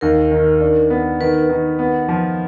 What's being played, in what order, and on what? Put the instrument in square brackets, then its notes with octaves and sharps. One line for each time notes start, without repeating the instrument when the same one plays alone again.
[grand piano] D#2 [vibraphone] A#4
[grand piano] D#3
D4
B3
[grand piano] D#3 [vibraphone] B4
[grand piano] D#3
B3
F3